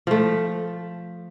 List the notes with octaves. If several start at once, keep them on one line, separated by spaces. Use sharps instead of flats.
F3 A3